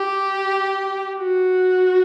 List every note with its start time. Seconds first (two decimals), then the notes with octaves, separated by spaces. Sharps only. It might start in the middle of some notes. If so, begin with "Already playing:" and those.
Already playing: G4
1.18 F#4